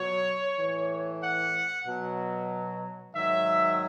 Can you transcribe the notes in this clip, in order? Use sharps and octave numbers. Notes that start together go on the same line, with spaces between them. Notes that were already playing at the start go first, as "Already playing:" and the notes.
Already playing: B2 F#3 C#5
A2 E3
F#5
B2 F#3
G#2 D#3 F#3 E5